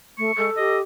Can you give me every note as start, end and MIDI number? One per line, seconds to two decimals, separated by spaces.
0.18 0.31 57
0.18 0.47 85
0.38 0.50 56
0.38 0.78 69
0.57 0.81 67
0.57 0.77 75